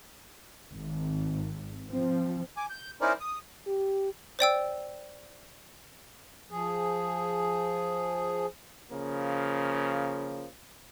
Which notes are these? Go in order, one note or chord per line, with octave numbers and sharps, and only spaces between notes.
G#1
F3 C4
G#5 D6
G6
C#4 D#4 E4 A#4 C5 D5
D#6
G4
C5 D5 G5 E6
F3 G#4
C#3 F3 A#3